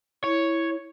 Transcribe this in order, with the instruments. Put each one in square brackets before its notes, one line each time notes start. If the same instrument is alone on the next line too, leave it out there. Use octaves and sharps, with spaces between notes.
[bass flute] E4 [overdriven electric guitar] C#5